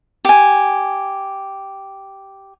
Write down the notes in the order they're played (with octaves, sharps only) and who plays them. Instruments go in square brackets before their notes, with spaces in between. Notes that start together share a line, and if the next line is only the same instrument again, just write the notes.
[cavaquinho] G4 G#5